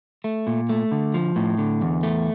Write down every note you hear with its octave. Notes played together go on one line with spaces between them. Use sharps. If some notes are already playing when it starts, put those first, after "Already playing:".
A3
A#2
A3
D3
F3
A2
D3
E2
A3